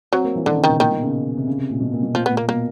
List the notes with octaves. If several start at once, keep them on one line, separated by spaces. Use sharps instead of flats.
F#3 C4
A#3
E3
D3 D#3
C#3
D#3
B2
A#2 D#3
B2
C#3
C3
C#3
C3
A#2
B2
A#2
B2
A#2 F3
B3
A#2
A#3
B2 A#3